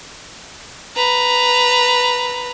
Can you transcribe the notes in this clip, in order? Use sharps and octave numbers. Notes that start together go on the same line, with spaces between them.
B4 A#5